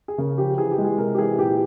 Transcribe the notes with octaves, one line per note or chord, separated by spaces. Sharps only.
G#4
C#3 A#4
F3 G4
E3 G#4
G4
G#3
G#4
C3 A#4
G4
E3 G#4
A#2 G4